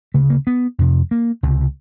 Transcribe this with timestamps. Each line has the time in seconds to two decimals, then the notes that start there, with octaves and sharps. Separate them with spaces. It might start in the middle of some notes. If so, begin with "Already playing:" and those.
0.14 D2 C#3 A3
0.30 A#3
0.47 B3
0.79 F2 C3
1.11 A#3
1.43 C#2 C3